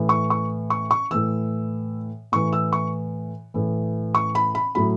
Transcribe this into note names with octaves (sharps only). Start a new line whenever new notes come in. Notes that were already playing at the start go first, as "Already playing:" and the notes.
Already playing: A2 E3
C#6
C#6
C#6
C#6
A2 E3 E6
A2 E3 C#6
E6
C#6
A2 E3
C#6
B5
B5
A2 F#3 B5